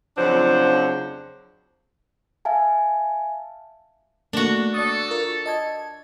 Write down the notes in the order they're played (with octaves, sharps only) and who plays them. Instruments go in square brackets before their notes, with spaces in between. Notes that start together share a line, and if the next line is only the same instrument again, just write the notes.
[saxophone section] F2 C#3 F3 F#3 D4 C5
[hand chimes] E5 F5 G#5 A5
[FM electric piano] A3 A#3 [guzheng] D4 F#4
[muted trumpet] A4 [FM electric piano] D5 D#6
[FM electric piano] F4 A#4
D#5 A5 G#6